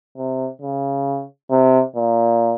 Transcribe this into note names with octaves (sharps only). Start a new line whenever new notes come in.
C3
C#3
C3
A#2